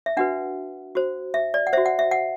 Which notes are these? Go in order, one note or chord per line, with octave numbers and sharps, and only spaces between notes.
E5
D4 F#4 B4 F#5
F#4 C5
E5
D5
F#5
F#4 C5 E5
F#5
E5
F#5